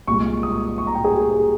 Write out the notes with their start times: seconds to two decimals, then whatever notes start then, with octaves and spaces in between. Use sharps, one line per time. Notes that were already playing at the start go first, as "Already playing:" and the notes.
0.07 C2 A#2 G#3 C#6
0.43 D#6
0.78 C#6
0.87 A#5
0.95 G5
1.05 G#4
1.14 G4
1.31 G#4